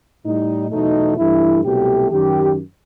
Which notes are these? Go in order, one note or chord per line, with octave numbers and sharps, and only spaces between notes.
A2 G3 D#4
E2 B2 F#3 A3 D#4
G2 E3 A3 E4
C2 B2 F#3 A3 G4
F#2 D#3 F#3 G4